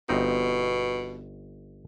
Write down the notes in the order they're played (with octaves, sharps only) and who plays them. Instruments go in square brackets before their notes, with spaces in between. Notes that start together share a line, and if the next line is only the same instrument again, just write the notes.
[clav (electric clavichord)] G1 C4 D#4 [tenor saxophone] B2